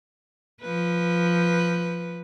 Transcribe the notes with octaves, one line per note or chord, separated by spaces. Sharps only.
F3 B4